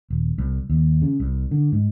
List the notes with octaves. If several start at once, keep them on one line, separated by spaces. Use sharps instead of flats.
D#1
C2
D#2
C#3
C2
D3
G#2